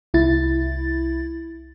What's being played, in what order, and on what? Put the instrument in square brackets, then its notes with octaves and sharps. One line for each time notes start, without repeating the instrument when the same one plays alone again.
[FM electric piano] C2 E4 A6